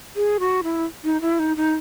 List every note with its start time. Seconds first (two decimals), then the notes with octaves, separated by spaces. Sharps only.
0.16 G#4
0.40 F#4
0.63 E4
1.04 D#4
1.21 E4
1.39 D#4
1.57 D#4